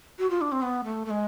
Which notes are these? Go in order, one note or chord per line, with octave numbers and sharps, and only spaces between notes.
F#4
F4
D4
C4
B3
A3
A3
G#3